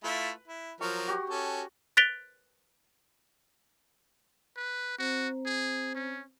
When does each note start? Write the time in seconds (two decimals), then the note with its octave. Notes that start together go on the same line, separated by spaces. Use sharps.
0.04 A3 E4 F4 B4
0.48 E4
0.81 F3 F#3 A#4 C#6
1.08 F#4 G4
1.30 C#4 A4
1.97 F#6 A6 B6 D7 F7 G7
4.56 B4
4.98 C4 F#4 C5 A#5
5.45 G#4
5.95 C#4